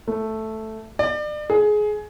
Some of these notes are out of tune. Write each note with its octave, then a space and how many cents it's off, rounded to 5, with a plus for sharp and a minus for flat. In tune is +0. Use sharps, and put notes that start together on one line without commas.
A3 +0
D5 +35
G#4 +20